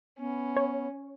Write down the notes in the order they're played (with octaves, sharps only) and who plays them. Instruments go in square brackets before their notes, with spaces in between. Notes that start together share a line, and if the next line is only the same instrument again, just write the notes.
[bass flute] B3 [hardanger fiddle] C#4
[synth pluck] C#5